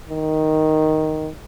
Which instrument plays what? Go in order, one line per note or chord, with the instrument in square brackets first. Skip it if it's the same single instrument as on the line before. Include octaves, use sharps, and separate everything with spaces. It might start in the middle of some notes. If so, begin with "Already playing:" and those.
[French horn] D#3